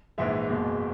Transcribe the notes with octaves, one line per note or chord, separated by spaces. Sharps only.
A#1 G#2 E3 G#3 E5
F#1 E2 B2 G#3